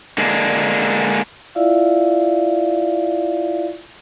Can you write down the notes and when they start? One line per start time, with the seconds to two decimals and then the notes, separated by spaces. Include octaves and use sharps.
0.18 D3 G#3 A#3 D4
1.55 E4 F4 D5 E5 F5